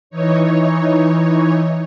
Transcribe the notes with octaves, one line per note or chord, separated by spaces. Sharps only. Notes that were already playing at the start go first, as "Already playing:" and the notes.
E3 D#4 C#5